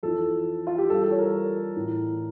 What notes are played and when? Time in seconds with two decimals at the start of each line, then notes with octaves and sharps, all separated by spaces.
0.03 F2 E3 A4
0.67 F4
0.78 G4
0.89 G2 E3 A4
1.04 A4
1.11 C#5
1.19 A#4
1.76 A2 E3